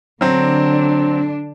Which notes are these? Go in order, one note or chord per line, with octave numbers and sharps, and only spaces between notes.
D3 F#3 C4 D4